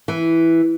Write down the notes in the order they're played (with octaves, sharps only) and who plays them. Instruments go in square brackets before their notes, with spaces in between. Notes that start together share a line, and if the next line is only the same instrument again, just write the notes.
[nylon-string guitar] E3